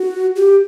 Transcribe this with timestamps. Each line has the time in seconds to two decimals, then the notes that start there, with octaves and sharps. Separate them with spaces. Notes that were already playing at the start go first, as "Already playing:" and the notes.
Already playing: F#4
0.36 G4